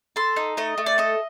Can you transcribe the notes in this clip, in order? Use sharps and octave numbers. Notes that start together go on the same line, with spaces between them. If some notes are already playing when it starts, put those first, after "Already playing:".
A4 C6
D#4
A3 D#5
A3
D5
A4 D#5